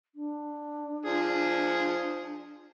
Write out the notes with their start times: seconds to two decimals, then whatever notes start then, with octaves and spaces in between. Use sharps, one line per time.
0.15 D4
1.05 F3 G#4